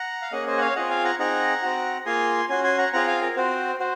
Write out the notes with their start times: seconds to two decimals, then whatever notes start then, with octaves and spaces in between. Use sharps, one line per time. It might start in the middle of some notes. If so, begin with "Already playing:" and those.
Already playing: F#5 A#5
0.22 F5
0.32 A#3 C#4 G#4 D#5 F#5
0.47 C5 D#5
0.57 F#5
0.61 C#5 F5
0.76 C4 F4 G#4 D#5 F#5
0.90 F5 G#5
1.04 F#5 A#5
1.19 C4 D#4 G#4 F#5 A#5
1.62 C4 F#4
2.06 A#3 F4 G#4 G#5 C6
2.49 C#4 F#4 G#5 C6
2.64 G#5 C6
2.78 F#5 A#5
2.93 C4 F4 G#4 F#5 A#5
3.07 F5 G#5
3.22 A#4
3.37 C4 F#4 C5
3.80 F#4 C5